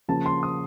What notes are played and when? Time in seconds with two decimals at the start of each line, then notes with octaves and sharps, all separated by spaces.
0.08 C#3 F3 A#3 A5
0.26 C6
0.43 D#6